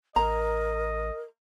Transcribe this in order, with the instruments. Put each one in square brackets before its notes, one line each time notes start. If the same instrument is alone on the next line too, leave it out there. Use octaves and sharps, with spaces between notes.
[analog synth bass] A1 [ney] A#4 [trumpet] D#5 [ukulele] A#5